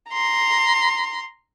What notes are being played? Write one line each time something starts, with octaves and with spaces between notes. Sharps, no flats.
A#5 C6